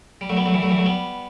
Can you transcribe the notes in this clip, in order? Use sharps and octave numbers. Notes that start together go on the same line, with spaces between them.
G3
F#3 A3
G3 B3
F#3 A3
E3 G3
F#3 A3
E3 G3
F#3 A3
G3 B3